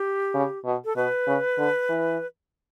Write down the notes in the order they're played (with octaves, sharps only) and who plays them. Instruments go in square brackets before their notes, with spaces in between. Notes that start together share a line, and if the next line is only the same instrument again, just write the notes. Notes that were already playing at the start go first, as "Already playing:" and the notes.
Already playing: [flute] G4
[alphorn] C#3
B2
[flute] A4
[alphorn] B2 [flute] B4
[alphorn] C#3
D3
E3